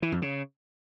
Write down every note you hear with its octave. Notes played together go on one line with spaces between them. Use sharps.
E3
F2
C#3